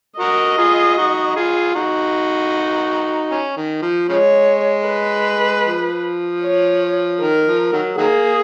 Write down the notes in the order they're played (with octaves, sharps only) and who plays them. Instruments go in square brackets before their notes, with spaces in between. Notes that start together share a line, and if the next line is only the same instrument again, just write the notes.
[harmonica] F#4 A#4 [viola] D#5
[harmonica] F4 G#4
D#4 F#4
F4 G#4
D#4 F#4
C#4
D#3
F3
[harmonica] C#3 F3 G#3 [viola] C#5
[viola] B4
[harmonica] F3
[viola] C#5
[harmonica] D#3 [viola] A#4
[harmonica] F3
D#3 F#3
[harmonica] D#3 F#3 A#3 [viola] G#4